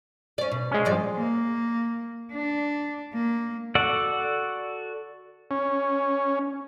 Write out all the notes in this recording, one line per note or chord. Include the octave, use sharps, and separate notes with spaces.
C#4 D5
B2
G#3 C#4
G2 F3 D5
A#3
D4
A#3
F#4 A4 D5 F#5
C#4